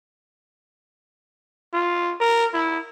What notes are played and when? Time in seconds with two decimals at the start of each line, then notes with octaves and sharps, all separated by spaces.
1.73 F4
2.20 A#4
2.54 E4